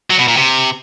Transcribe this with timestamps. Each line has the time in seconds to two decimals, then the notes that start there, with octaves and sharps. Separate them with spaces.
0.10 F#3
0.19 B2
0.28 A#2
0.37 C3